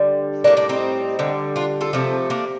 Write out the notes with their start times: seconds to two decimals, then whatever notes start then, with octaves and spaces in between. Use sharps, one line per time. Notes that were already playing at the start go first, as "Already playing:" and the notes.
Already playing: D3 G3
0.44 A2 G3 A#3 D4
0.57 A#3 D4
0.69 C4 D#4
1.19 D3 G3
1.56 D4 F4
1.81 F4 A4
1.93 C3 F3 A3
2.30 A#3 D4